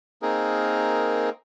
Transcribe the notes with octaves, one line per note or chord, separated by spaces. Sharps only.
A#3 C4 D#4 G#4 A#4